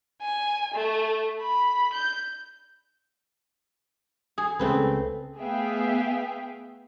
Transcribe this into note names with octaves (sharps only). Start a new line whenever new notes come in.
G#5
A3
B5
G6
G#4
C#2 C#3 A3 C4 B4
A3 B3 G#4 E5 F5 G5